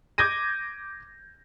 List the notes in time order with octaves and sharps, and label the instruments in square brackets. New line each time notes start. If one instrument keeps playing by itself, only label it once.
[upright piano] D6 G6 G#6 A#6 D#7